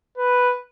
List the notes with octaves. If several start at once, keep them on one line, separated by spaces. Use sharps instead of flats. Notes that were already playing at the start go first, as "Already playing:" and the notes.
B4